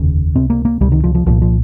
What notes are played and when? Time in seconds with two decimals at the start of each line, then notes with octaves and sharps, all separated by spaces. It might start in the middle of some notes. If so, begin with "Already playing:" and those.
Already playing: F1 D#2 C#3
0.35 C#2 C3 C4
0.50 A#3
0.65 A#3
0.81 C#2 C3 G3
0.92 D#3
1.04 F3
1.15 F3
1.26 C2 A#2 F3
1.42 F3